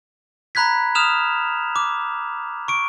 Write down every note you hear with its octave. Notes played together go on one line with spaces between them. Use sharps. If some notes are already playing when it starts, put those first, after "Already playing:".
A#5 B5 F#6 G#6 B6
D#6 F6 E7 F7
D6
C#6 D7